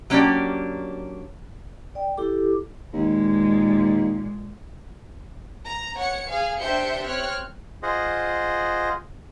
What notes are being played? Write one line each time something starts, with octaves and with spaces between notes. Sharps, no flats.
F#3 A#3 C#4 D4 G4 D5
D5 G5
E4 G4 A4 D6
D#2 A#2 G#3
A#5
C#5 F#5 C#7
G#4 F5
D4 G4 C5 E5 G6 C#7
C4 C#5 F6 F#6
F4 G#4 C5 D#5 F#5